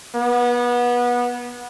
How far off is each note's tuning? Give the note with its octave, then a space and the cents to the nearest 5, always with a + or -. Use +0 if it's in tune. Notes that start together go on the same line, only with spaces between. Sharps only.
B3 -25